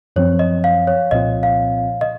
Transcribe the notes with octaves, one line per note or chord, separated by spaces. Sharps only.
F#2 F3 C4 C#5
D#5
F5
C#5
C2 A#2 F3 C4 F4 D#5
F5
D#5